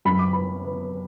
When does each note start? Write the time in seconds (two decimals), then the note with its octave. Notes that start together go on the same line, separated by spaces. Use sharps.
0.05 F#2 B5
0.19 D6
0.33 B3 B5
0.64 B3